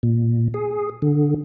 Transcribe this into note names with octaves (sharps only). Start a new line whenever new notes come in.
A#2
G#4
D3